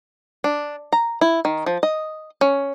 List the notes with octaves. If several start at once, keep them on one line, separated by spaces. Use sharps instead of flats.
D4
A#5
E4
D#3
F3
D#5
C#4